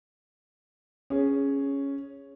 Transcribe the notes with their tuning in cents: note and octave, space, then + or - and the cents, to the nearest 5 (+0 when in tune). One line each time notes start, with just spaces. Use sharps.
C#4 +0 G#4 +0